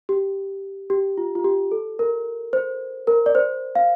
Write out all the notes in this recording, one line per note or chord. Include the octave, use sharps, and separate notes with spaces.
G4
G4
F4
F4
G4
A4
A#4
C5
A#4
D5
C5
F5